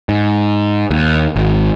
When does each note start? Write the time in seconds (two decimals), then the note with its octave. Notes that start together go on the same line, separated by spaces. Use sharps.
0.09 G#2
0.91 D#2
1.36 G#1